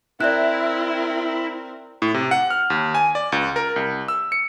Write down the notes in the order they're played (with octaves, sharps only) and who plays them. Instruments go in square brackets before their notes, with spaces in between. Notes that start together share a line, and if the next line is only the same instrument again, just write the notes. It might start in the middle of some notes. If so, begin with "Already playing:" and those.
[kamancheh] C4 A#4 [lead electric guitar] E4 [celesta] D5 E5 F#6
[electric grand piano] A2
C3
F#5
F6
D#2
G#5
D5
C#2
A#4
C2
E6
C#7